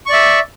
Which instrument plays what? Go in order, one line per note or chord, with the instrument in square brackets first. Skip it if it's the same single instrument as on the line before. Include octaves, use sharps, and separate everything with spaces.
[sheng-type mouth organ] C#6
D5
E5